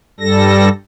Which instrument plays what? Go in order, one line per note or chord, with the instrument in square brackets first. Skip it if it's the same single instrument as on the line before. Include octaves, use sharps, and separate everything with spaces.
[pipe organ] G2 G3 A4 A#6